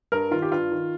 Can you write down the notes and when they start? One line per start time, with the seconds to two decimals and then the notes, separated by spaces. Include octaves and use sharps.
0.12 G2 A#4
0.31 D#3 F4
0.42 G4
0.51 G2 F4
0.72 D#3